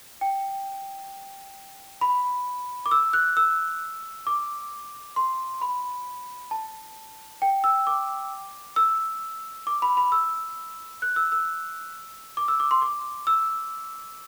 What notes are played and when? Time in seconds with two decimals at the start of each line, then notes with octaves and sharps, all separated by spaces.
0.21 G5
2.01 B5
2.86 D6
2.91 E6
3.13 F#6
3.37 E6
4.27 D6
5.16 C6
5.61 B5
6.51 A5
7.42 G5
7.64 E6
7.87 D6
8.76 E6
9.67 D6
9.82 B5
9.97 B5
10.12 E6
11.02 F#6
11.16 E6
11.32 E6
12.37 D6
12.48 E6
12.60 D6
12.71 C6
12.82 D6
13.27 E6